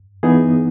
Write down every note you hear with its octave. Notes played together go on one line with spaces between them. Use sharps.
E3 B3 D#4 G#4